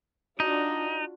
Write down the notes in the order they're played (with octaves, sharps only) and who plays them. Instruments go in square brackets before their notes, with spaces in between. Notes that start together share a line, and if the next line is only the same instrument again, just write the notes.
[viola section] D4 F4 F#4 [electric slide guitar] D#4